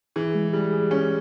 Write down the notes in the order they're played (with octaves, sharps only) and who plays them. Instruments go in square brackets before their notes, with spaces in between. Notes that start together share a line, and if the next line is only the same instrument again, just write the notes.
[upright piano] E3 [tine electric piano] G#4
[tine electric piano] G#3
[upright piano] G3 [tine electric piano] G#4
[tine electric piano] G#4
[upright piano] C#4 [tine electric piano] G#4